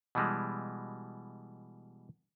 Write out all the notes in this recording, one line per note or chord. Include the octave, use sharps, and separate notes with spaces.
B2 E3 G3 G#3